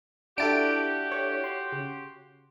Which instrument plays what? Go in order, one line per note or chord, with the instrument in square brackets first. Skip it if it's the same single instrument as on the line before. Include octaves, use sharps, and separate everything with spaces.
[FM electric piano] D4 E4 A4 [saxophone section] F#4 G4 [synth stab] A5 D7
[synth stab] C#5
[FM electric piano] C6
[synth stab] C#3